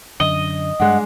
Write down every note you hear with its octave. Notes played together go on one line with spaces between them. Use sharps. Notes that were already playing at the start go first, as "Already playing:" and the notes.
F#2 D3 D#5
G2 G#3 D4 F#5